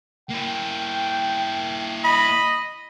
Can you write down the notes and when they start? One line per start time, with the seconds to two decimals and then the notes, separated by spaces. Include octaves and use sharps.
0.30 A#3 E4 G5
2.04 D#5 B5